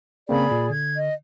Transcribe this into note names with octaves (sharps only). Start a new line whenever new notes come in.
C#3 A#3 C4 G#4 D5 B5
A#2
D3 G#6
D#5